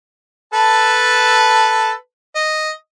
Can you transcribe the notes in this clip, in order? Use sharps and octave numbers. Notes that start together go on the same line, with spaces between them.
A4 B4 A5
D#5